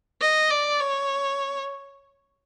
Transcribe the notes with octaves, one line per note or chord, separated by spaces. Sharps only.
D#5
D5
C#5